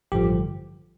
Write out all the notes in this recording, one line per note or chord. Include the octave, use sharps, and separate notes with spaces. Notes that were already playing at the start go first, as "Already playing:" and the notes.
A1 G2 D3 F3 G4